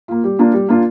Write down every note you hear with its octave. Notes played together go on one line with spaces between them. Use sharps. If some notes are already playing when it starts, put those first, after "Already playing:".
A#3 F4
G3
A#3 D4 F4
G3
A#3 D4 F4